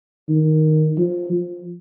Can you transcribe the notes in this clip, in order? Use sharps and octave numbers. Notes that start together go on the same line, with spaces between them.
D#3
F3
F3